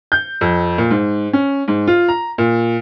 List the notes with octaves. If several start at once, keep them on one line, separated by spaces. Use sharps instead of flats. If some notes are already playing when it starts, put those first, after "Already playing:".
G6
F2
A#2
G#2
C#4
G#2
F4
A#5
A#2